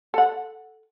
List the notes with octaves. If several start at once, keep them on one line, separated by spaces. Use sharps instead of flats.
A4 F#5